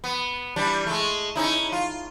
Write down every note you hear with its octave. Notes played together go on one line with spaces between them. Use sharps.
B3
E3 G3 D4
G#3 A3
C#4 D#4 E4
F4